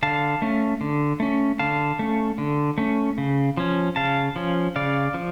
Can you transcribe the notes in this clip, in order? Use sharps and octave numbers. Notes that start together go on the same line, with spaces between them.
D3 F5 A5
A3 C#4
D3
A3 C#4
D3 F5 A5
A3 C#4
D3
A3 C#4
C#3
F3 C#4
C#3 F5 A5
F3 C#4
C#3 D5 F5
F3